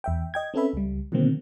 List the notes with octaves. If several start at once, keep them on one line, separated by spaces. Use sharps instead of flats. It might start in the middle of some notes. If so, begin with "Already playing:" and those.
E2 E5 G5
D#5 G5 G#6
C4 C#4 A4 B4 E5 B5
C#2 G3
B2 D3 D#3 F#3 A#3 C4